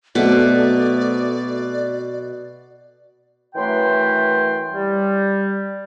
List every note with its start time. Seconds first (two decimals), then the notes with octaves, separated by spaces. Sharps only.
0.15 B2 F#3 A3 C4 D5 D6
3.55 F#2 E3 A3 B4 G5 C6
4.73 G3